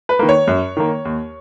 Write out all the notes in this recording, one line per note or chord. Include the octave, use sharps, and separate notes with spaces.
B4
D#3 A#3
C#5
F#2
D#3 A#3
D#2